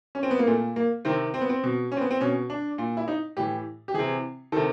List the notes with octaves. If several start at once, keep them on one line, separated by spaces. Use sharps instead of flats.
C#4
C4
B3
A#3
A#2 A3
A#3
C3 D#3 C4
C4
B3
C4
B2
C#4
C4
B3
C4
B2 C#4
D4
A#2
E4
D#4
A2 E3 G4
G4
C3 E3 G#4
C3 D#3 A4